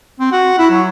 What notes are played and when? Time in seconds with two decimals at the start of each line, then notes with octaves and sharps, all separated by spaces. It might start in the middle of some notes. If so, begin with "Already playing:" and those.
0.20 C4
0.32 F#4
0.58 E4
0.70 F#3